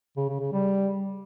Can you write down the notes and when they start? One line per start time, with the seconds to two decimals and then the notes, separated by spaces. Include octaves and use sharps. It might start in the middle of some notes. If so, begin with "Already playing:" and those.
0.17 C#3
0.29 C#3
0.40 C#3
0.52 G3